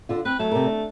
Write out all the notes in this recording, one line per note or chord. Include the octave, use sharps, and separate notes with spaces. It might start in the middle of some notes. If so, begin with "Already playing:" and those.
D3 F4
C4 B4
F#3 A3
C3 A#4
D4